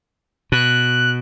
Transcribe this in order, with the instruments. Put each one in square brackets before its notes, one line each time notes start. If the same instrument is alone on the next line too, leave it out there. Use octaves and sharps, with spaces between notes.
[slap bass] B2 [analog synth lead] F#6